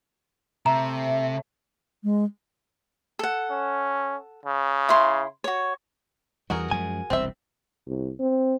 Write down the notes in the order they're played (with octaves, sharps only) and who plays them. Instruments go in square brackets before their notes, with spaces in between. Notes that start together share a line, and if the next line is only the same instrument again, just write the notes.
[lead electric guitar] C3 [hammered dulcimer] A3 [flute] E5 [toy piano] A#5
[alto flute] G#3
[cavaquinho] A4 F#5
[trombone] C#4
C#3
[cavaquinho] E4 C6
F#4 C#5
[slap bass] E2 E3 G3 [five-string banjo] F#4 G#4 A#4
[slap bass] F#2 F3 G#3 [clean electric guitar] G#5
[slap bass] E1 C2 [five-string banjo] C4 E5
[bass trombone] C2
C4